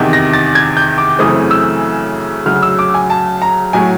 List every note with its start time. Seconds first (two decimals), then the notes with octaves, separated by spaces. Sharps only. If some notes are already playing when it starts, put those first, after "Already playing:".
Already playing: E2 C3 D#3
0.13 A#6
0.33 A6
0.55 G#6
0.77 G6
0.98 D6
1.19 F#2 C#3 E3 A3 C4 D#6
1.51 E6
2.46 D2 C#3 F#3 F6
2.63 E6
2.79 D6
2.94 G#5
3.10 A5
3.42 A#5
3.73 A2 F#3 G#5